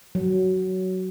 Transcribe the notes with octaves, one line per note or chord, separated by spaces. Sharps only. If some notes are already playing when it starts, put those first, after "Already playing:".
F#3